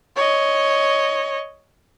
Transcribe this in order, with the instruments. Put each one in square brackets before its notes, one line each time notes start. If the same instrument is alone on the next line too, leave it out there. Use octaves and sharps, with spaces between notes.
[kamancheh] C#5 D#5